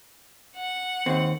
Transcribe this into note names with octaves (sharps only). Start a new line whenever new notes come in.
F#5
D#2 C4